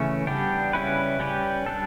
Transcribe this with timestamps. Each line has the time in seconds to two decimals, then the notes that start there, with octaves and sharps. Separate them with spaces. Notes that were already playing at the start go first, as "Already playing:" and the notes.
Already playing: C#3 E3 A3 C#4
0.27 G3 B3 D4 G4
0.73 C#3 G3 C#4 E4 B4
1.20 G3 C#4 G4 B4
1.66 G3 D4 A4